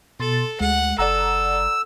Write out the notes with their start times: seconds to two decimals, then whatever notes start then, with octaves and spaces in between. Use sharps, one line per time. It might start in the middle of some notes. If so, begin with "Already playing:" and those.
0.20 B2 A4 C6 A6
0.60 D2 G#3 F#5
0.99 F#1 A4 D5 F#5 A#5 E6